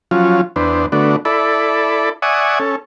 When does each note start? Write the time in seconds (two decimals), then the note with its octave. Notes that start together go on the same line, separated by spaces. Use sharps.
0.11 F3 F#3 C#4 F4
0.56 E2 B3 D4 C5
0.92 D3 A3 B3 D4 F#4
1.25 E4 A4 D5 B5
2.22 D5 E5 F#5 G#5 C#6 D#6
2.59 C#4 A4